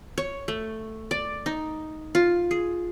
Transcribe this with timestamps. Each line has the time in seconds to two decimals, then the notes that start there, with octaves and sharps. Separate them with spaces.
0.18 C#5
0.48 A3
1.11 D5
1.46 D#4
2.15 F4
2.51 G#4